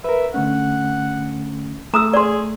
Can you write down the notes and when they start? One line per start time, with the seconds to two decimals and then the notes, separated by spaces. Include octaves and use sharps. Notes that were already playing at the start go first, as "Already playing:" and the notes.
0.04 A#4 B4 E5
0.34 D3 A3 C#4 F#5
1.94 A3 A#5 D#6 E6
2.14 G#4 D5 C6